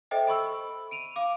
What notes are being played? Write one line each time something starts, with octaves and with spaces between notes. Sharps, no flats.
A4 C5 D#5 E5 G5
A4 B5 C#6 E6
D7 D#7 F7
F5 D6